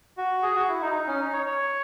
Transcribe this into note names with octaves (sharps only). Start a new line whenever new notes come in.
F#4
G#4
F#4
E4
D#4
D#4
C#4
D#4
C#5
C#5